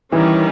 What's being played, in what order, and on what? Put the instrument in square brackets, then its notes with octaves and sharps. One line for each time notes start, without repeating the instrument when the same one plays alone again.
[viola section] D#3 G3 C#4 [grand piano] E3